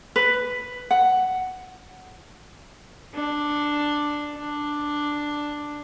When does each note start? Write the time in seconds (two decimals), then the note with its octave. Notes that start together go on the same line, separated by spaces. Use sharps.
0.16 B4
0.91 F#5
3.14 D4
4.35 D4